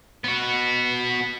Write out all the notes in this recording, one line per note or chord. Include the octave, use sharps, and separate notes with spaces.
B3 F#4